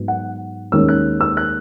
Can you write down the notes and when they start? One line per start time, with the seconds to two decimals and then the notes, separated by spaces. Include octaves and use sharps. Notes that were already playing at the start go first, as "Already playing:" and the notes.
Already playing: G#2 F#3 B3
0.08 F#5
0.72 D#2 D#3 G#3 C#4 E6
0.88 F#6
1.21 E6
1.37 F#6